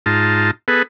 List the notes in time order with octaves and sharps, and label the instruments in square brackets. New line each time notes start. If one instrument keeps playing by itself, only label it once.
[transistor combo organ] G#2 D#4 F4 A5
B3 G#4 A4 B4